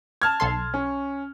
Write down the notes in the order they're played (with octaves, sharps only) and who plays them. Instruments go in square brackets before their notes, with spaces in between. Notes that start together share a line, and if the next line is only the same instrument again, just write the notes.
[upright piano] A5 F6 G#6
[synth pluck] B1 A4 C6
[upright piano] C#4